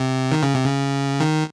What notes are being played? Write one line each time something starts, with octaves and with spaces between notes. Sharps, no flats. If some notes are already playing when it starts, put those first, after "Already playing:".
Already playing: C3
D#3
C#3
C3
C#3
D#3